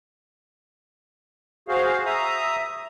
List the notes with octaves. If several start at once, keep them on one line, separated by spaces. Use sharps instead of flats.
F#4 G#4 C5 F5
E5 A#5 D#6